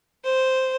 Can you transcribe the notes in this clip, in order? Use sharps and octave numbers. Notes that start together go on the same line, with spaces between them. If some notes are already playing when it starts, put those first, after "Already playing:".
C5